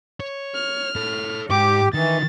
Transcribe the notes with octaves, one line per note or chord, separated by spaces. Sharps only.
C#5
F6
A4 C#5
G#2 G4 D6
D#3 E3 A6